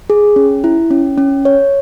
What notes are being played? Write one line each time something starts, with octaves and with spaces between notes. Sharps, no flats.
G#4
C#4
E4
C#4
C#4
C#5